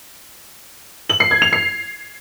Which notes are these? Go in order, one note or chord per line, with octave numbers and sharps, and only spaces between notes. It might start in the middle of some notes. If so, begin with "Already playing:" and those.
F#7
C7
G#6
F7
C7